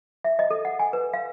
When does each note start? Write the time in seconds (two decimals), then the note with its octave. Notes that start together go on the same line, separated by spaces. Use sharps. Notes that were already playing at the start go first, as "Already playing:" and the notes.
0.24 E5
0.39 D#5
0.51 A4
0.65 F#5
0.79 G#5
0.93 B4
1.13 F5